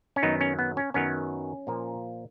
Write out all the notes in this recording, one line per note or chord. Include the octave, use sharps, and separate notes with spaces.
C#4
F#2 D#3 F#3 B3 D#4
C#4
B3
C#4
F#2 D#3 F#3 B3 C#4
A#2 F3 A#3